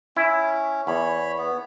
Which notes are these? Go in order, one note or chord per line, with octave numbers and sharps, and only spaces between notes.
C#4 E4
E2 C#5 B5
B3